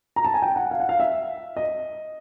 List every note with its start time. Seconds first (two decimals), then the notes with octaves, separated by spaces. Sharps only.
0.16 A#5
0.25 A5
0.34 G#5
0.42 G5
0.56 F#5
0.71 F5
0.80 F#5
0.89 F5
1.00 E5
1.57 D#5